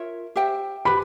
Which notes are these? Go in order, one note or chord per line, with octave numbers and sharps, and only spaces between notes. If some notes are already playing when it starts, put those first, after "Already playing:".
Already playing: F4 A#4 C#5 E5
G4 C5 E5 G5
G4 B4 B5